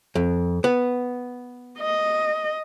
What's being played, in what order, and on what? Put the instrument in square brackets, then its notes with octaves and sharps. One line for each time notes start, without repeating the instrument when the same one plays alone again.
[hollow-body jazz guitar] F2
B3
[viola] D#5